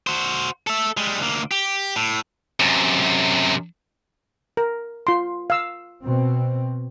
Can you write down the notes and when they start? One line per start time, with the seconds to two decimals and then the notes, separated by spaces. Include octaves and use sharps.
0.07 F#4 C5
0.67 A4 E5
0.97 G3 G#3
1.20 D2 A#3
1.51 G4
1.96 A2
2.60 F#2 C3
4.57 A#4
5.07 F4 C6
5.50 F5 E6
6.04 B2 C4